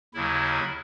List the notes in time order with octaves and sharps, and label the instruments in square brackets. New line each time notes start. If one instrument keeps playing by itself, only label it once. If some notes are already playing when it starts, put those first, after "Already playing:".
[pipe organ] D#2 C#3 F#3 E4